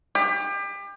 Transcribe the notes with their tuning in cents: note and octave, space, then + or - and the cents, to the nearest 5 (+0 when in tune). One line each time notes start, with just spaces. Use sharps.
G4 +30